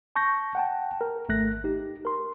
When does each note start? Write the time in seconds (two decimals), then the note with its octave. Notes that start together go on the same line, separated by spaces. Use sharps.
0.16 A5 C#6 G6 A#6
0.55 F#5 G5 A5
1.01 A#4
1.29 G#1 A3 F#6 A#6
1.64 D#4 G4
2.05 A#4 C6